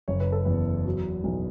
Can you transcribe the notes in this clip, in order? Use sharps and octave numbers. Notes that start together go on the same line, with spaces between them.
F#1 C#5
B4
A4
E2 B4
F#3
B1